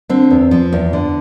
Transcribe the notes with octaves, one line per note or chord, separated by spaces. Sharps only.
D3 C4
E2
F3
E2
D3